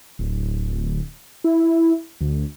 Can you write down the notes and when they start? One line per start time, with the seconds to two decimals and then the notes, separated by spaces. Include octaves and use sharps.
0.19 D1
1.44 E4
2.21 D2